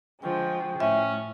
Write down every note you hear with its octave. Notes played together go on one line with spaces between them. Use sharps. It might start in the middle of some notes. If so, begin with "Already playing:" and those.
D3 F3 G#3 G5 C#6
A2 C#4 E5